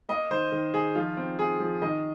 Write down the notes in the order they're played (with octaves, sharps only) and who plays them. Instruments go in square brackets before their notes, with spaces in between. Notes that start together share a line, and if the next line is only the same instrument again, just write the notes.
[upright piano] A#3 D#5
D#3 C5
D#3
D#3 G#4
F3 F4
C4
C4 G#4
F3
D#3 D#5